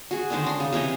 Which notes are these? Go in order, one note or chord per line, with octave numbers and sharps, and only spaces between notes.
F#4 G#4
D3 D#3 G#3 C5
C#4 D4 C6
C#3 D#4
C3 E3 C#5 D#5